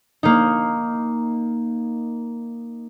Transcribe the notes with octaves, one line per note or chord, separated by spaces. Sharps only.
A#3 D#4